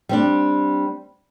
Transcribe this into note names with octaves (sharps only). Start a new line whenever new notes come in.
G3 C4 D4